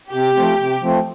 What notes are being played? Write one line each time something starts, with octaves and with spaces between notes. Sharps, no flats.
C3 G4
F3 A3 C4
C3
F3 A3 C4